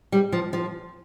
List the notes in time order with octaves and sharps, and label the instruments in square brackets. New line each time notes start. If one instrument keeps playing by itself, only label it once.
[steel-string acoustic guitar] G3
F3
F3